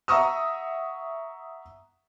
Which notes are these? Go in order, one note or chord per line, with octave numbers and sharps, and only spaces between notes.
E5 F#5 A#5 C#6 D#6 E6